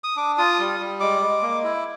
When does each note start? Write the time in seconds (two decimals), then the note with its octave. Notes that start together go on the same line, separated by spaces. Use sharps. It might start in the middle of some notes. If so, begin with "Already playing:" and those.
0.04 D#6
0.16 D4 D6
0.38 F4 D#6
0.59 G3
0.80 G3
1.00 G#3 D6
1.22 G#3
1.42 A#3
1.64 E4